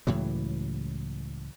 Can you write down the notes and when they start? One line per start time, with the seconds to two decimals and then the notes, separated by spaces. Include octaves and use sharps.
0.07 C#2 A2 E3 F#3